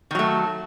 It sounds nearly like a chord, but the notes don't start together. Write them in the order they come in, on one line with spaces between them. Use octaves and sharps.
D#3 F#3 A3